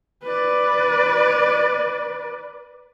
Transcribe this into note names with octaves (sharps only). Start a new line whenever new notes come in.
B4 D5